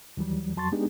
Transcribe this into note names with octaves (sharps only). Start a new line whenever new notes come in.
D#2 E3 F#3 G3
F2 F#3 A5 C6 C#6 A6
G#3 B3 D4 D#4 G4 G#4